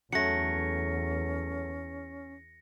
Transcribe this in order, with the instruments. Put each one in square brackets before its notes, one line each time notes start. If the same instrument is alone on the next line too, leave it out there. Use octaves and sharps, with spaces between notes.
[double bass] E2 [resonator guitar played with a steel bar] F#3 A3 [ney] C#4 [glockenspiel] A#6 C#7